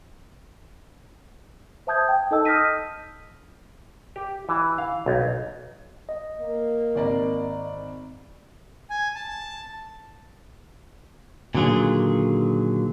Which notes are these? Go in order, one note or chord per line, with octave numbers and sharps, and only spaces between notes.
C5 E5 A5 D#6 G6 G#6
G5
D#4 A4 D#5 A5 E6
D#6 F6 G6 A#6 B6 D#7
G4
E3
F5
B1
D#5
A#3
G#1 D5 A#5
G#5
A5
A#2 D3 D#3 F#3 F4 G#4